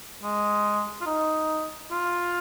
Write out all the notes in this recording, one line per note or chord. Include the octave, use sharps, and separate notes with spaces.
G#3
F4
D#4
F4